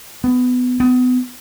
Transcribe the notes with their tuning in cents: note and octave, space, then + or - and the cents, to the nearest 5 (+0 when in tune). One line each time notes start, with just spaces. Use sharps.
B3 +20
B3 +30